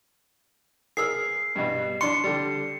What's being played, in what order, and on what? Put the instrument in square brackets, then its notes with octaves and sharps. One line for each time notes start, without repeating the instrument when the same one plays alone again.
[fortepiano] G#4 A#4 E6 [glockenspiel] C7
[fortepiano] G2 B2
[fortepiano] D4 C6 [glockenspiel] C#7
[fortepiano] D3 G3